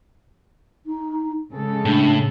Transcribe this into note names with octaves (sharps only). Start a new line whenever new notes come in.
D#4
C#3 G#3 C#4 A4
A2 D4